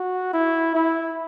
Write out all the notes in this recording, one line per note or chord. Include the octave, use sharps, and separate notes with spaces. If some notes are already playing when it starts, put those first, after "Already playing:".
Already playing: F#4
E4
E4